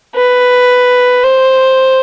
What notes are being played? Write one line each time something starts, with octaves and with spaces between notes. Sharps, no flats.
B4
C5